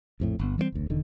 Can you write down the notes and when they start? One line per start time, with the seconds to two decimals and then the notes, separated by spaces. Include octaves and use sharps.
0.20 A#1 F2 A2
0.40 G1 B3
0.58 E3 G3 A3 C4
0.72 F1 D2
0.90 E1 D3 D#3